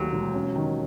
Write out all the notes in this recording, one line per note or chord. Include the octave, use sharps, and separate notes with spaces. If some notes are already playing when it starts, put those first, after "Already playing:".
Already playing: D#2 F#3 A3
E1
C#4
D#3